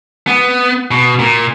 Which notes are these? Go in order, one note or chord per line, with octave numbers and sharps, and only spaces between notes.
B3
B2
A#2